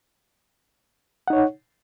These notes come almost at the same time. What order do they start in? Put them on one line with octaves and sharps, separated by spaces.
F#5 D#4 C#5